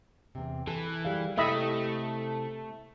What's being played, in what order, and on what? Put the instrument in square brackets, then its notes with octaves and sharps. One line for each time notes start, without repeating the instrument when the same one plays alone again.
[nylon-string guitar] E2 C3
[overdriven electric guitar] E3 [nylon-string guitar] A4
[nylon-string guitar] G3 G#4 F5
[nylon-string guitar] C3 E4 G4 [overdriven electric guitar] A3 [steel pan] D#5 E5 B5